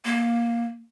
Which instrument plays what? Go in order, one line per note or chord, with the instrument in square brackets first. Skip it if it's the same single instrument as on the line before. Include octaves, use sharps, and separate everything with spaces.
[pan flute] A#3